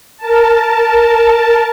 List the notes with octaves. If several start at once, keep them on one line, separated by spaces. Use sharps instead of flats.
A#4 A5